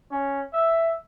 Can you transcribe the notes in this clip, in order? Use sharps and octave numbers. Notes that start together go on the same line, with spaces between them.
C#4
E5